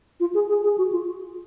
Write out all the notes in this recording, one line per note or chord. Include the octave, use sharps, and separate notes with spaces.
F4
G#4
G#4
G#4
F#4
F4